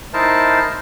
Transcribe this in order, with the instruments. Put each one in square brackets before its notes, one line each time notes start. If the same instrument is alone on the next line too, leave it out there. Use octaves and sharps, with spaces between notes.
[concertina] D#4 E4 A#4 C5 A5